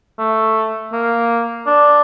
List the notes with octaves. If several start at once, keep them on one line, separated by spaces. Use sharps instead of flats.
A3
A#3
D4